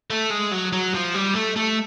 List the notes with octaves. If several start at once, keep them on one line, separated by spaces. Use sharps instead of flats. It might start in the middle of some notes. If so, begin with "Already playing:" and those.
A3
G#3
F#3
F#3
F3
G3
A3
A3